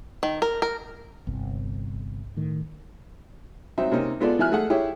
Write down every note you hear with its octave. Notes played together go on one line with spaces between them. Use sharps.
D#3
A#4
A#4
G1 C2 C3
A2 D#3
F#3 C4 D#4 E5
C3 A#3 C#4 D#4
G#3 B3 F4 A4 D5
E3 F#3 E5 G#5 F6 F#6
A3 G#4 F#5
E4 G4 G#4 C#5 E5